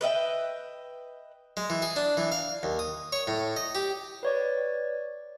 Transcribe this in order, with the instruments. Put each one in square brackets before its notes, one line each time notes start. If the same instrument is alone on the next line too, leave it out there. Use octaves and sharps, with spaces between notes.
[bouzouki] B4 D#5 E5 G5
[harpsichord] G#3
E3
G#4
D4
E3
F5
D#2
D#6
C#5
A2
D#5
G4
[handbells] B4 C#5 D5